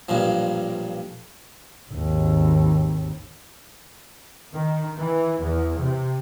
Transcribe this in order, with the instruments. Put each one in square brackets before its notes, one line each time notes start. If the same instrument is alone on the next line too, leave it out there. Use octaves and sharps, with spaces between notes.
[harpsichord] B1 G2 A#2 F3
[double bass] G#1 D#2
[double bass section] D#3
E3
E2
C3